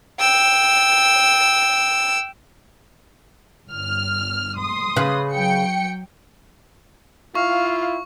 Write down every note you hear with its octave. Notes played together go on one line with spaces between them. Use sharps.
G5 E6
G1 F6
C6 D#6
C#3 B4
F#3 G5 C#7
E4 F4 F5 C#6